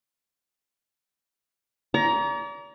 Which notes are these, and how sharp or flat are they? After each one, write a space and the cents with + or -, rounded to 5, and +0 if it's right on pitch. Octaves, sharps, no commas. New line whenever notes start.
D5 -40 A#5 +15